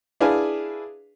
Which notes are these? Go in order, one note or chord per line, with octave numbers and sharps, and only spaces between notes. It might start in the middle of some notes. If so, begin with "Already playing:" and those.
D4 E4 G#4 B4 F5 G#5